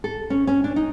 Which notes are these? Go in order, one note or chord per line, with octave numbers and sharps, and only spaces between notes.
A4
C#4
C#4
D4
D#4